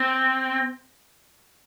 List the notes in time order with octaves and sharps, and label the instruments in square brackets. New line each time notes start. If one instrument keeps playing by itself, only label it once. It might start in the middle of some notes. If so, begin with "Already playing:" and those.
Already playing: [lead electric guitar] C4